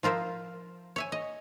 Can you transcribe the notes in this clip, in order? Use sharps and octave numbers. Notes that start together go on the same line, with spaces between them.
F3 F4 A#4 C5 E5
C#5 E5 G#5
D#5